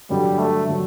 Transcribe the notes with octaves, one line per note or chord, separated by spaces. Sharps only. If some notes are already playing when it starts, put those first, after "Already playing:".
G2 D3 F#3 G3
A3
D3 F#3